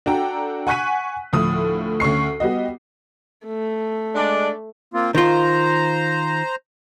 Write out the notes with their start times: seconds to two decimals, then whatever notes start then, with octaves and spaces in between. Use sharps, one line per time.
0.06 D4 F#4 A4 G5 A#5
0.67 F#5 G#5 C#6 F#6 B6 D#7
1.33 D2 A2 F3 D#6
2.00 D2 C#4 C#6 C7
2.40 G3 B3 F#4 D#5
3.47 A3
4.15 G#3 D4 D5
4.94 A#3 C4 F4
5.15 D#3 F4 C5 A#5